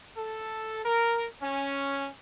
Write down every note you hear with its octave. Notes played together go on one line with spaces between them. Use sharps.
A4
A#4
C#4